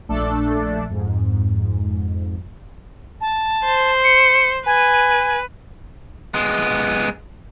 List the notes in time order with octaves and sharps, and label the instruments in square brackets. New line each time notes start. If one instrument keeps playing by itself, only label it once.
[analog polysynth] A#1 A3 D4 A4 D5
F2 G#2
[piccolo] A5
[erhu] C5
[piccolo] C#7
[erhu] B4 [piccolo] G#5
[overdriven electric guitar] G#3 B3